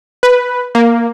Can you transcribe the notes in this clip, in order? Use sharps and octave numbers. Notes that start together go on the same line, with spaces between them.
B4
A#3